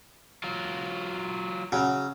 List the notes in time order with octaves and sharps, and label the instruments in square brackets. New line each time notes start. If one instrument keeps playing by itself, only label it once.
[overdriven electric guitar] F#3 F4
[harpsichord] C#3 F#3